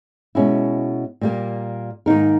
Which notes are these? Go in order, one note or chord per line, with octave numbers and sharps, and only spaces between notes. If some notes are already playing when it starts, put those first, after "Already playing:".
B2 G#3 C#4 E4
A#2 G3 A#3
G#2 D#3 A#3 D#4 A#4